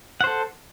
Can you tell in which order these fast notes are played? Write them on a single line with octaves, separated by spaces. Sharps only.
F#5 C5 A4